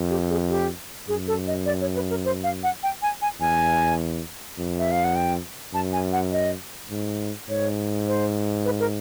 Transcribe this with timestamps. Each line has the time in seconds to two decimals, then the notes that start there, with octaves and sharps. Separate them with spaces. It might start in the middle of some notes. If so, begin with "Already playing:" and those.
Already playing: F2
0.10 G4
0.30 G#4
0.49 G4
1.08 F#2 G#4
1.28 A4
1.47 D#5
1.66 D5
1.81 C#5
1.95 B4
2.10 A#4
2.25 C5
2.44 F5
2.63 F#5
2.83 G5
3.02 G#5
3.22 G#5
3.41 E2 G#5
4.58 F2
4.79 E5
4.92 F5
5.04 F#5
5.16 G5
5.74 F#2 A5
5.93 G#5
6.13 F#5
6.32 D#5
6.91 G#2
7.49 G#2 C#5
8.08 C5
8.65 B4
8.80 A#4